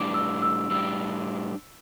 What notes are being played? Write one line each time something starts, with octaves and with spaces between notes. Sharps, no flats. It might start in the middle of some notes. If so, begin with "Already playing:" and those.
Already playing: A2 G3 D4 D6
E6
E6
A2 G3 D4 E6